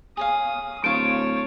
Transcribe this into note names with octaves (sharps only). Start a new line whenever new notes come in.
G#4 C#5 F5 D#6
D1 C5 C#5 F5 A5 D7